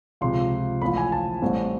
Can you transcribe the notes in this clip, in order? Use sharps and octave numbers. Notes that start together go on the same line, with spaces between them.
C#2 C3 F3 C6
A1 A2 F3 B5
G#5
A5
A1 A2 E3 G3 C4